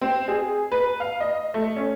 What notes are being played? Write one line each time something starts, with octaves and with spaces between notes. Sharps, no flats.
C4
G#4
B4
F5
D#5
A3
C#4